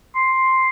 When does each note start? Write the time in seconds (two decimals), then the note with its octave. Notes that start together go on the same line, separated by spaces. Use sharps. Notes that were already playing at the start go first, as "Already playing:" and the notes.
0.15 C6